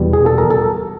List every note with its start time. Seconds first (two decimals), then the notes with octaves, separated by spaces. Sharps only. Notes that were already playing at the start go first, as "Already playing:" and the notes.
Already playing: E2 B2 G3
0.13 G#4
0.26 A4
0.38 A#4
0.50 A4